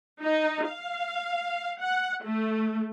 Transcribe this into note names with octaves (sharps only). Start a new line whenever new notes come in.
D#4
F5
F#5
A3